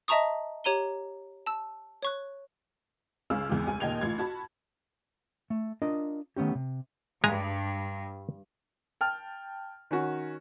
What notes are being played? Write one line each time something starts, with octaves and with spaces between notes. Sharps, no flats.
D#5 E5 A5 A#5 C#6 D#6
G4 C#5 A#5 D#7 G7
A5 E6
C#5 C#6 F#6
C#2 C#3 C#4 F5 E6 F6
G#1 E2
F1 C#2 G#5
D#2 A#2 D#5 G5 G#6 F7
A1 F4 G#6
F#4 A5 B5
A3
D4 F4 A#4 D#5
D#3 A3 B3 C#4 G4
C3
G2 G#3 G#5 A#5
G5 A5 F6
D#3 C#4 F#4